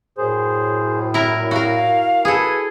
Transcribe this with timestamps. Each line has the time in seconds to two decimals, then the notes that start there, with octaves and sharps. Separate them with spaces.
0.18 F#2 A2 G#4 C5
1.14 A#2 E4 A#4
1.51 F#4 A#4 F5
2.25 G#4 A4 B4 G#5 B5